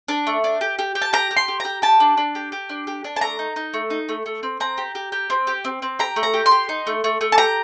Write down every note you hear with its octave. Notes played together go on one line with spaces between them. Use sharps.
D4
A3
D4
G4
G4
G4
A5
G4 A#5
G4
C6
G4
G4 A#5
G4 A5
D4
D4
G4
G4
D4
G4
D4
A5
A3 A#5
D#4
D#4
A3
D#4
A3
A3
C4
C4 A#5
G4
G4
G4
C4
G4
C4
C4
G4 A#5
A3
A#5
G4
C6
G4
D#4
A3
A3
A3
A5
G4 A#5